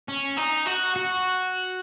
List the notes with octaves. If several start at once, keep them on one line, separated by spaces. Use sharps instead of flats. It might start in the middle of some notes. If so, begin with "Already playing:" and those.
C#4
D#4
F#4
F#4